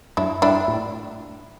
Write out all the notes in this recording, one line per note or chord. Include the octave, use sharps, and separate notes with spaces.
F#2 D4 E4
G2 D4 E4
A2